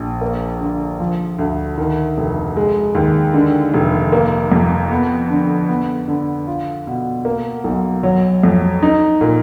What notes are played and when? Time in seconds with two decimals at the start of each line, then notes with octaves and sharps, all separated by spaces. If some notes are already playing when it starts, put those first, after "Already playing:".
Already playing: A#1
0.21 A#3
0.61 D3
0.99 F3
1.39 D2
1.78 D#3
2.17 F1
2.56 G#3
2.95 D#2
3.34 D3
3.74 F1
4.12 A#3
4.52 F2
4.91 B3
5.30 D3
5.69 B3
6.08 D3
6.47 F4
6.87 B2
7.25 A#3
7.64 B1
8.03 F#3
8.43 F2
8.83 D#4
9.21 A#2